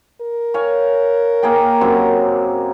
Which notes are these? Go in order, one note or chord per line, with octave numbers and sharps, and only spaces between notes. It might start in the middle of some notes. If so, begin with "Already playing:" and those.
A#4
C#5 F5 G#5
A#3 G#4 G5
F#2 C3 F#4